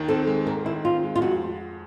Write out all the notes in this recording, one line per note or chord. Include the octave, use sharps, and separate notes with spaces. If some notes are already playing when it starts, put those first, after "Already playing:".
Already playing: D#2 D#3
C4 A4
G#3
G#2 A#4
D#3 E4
C4 F4
G#3
F4
F2 F#4